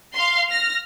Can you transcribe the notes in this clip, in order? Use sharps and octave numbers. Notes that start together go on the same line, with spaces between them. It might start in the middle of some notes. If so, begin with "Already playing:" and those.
F5 C6
F6 A#6